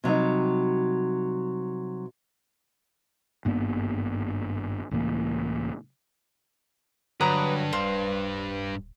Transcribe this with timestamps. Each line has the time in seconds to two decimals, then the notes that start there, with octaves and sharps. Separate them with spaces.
0.04 C3 F#3 G3 D#4
3.45 G#1 G2 A#3 B3
4.91 C#2 A2 E3 A#3
7.21 G2 D3 F#3 B4 A#5 D#6
7.73 D1 B4 C5 F5